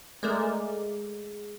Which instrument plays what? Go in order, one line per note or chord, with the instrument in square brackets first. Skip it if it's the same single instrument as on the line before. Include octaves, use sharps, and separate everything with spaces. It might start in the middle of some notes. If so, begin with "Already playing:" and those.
[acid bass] G#3 [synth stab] A3 A#4 D5